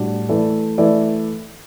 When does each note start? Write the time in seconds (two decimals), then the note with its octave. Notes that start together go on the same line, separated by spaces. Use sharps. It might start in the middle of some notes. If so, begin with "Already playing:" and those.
Already playing: A2 G3 D4 F#4
0.29 E3 A3 E4 A4 D5
0.78 E3 A3 E4 A4 D5